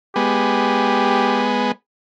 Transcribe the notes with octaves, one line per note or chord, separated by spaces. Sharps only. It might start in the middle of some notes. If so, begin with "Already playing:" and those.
G#3 B3 G4